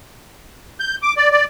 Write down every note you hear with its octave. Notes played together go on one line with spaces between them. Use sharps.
G6
D6
D5
D5